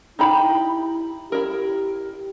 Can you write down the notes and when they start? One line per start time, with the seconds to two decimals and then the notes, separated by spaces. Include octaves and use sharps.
0.19 D#4 E4 G4 B5
1.32 E4 G4 A#4